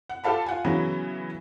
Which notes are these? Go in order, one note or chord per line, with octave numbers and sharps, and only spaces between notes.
F#5
F4 G4 A4 F5 A5 B5
F4 F#5 G#5
C#3 E3 F#3 B3